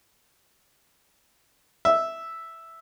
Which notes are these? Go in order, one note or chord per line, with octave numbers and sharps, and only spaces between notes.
E5